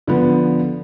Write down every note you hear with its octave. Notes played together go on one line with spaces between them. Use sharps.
D3 F3 B3